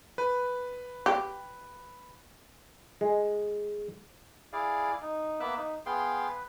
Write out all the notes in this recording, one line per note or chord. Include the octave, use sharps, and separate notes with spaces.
B4
G4
G#3
E4 G#4 D5 F5
D#4
A#3 B3 E5 D6 E6 F#6
D#4
B3 G#4 F5 G5 C6
B4